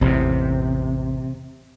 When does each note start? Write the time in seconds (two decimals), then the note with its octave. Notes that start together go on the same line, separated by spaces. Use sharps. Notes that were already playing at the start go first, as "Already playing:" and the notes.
0.01 A1 E2 C3